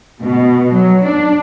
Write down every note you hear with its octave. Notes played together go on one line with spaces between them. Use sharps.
B2
F#3
D4